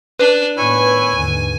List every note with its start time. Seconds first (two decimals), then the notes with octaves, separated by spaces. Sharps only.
0.19 D4 B4
0.57 A2 D#3 B3 E4 C#5 G#5
1.15 D#2 G#2 D3